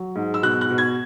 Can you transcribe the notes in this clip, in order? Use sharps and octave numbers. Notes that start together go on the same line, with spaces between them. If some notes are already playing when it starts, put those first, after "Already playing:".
Already playing: F#3
G#2
E6
B2 F#6
F#6
B2
G#6